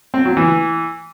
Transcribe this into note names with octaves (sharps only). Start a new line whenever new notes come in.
C4
F#3
E3